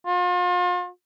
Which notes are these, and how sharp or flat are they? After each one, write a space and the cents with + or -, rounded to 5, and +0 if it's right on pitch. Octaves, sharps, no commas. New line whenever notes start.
F4 +40